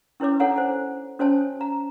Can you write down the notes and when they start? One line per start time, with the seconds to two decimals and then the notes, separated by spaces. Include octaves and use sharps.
0.20 C#4 E4 B4 C#5 D6
0.40 D4 A4 C#5 F#5 G#5 A#5
0.56 C5 G#5
1.19 C#4 F#4 C5 C#5 G#5 A5
1.61 A#5